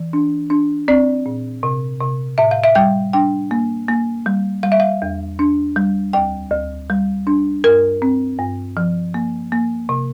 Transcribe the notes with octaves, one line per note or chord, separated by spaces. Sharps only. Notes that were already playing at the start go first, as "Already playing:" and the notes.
Already playing: E3
D4
D4
C4 D5
A#2
C3
C3
A2 E5
F5
E5
G3 G5
D4 G5
A#3
A#3
G3
G3 F5
E5
F5
E2
D4
G3
D2 G5
D2
G3
D4
G2 A#4
C4
G2
F3
A#3
A#3
C3